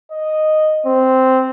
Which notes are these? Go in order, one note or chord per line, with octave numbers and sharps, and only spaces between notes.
D#5
C4